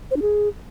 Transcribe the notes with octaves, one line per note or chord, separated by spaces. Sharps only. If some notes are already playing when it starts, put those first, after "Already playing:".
C5
D4
G#4